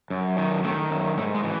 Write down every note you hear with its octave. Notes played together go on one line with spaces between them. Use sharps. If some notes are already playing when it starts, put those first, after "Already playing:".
F#2
D#3
D#3 A3
F#2
G#2 A3
G#3
E3